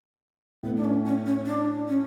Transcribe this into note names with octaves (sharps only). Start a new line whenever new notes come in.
A2 B3
D4
C#4
C#4
C#4
D4
C#4